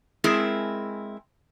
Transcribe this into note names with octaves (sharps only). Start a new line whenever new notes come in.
G#3 C4 E4 G#4 A#4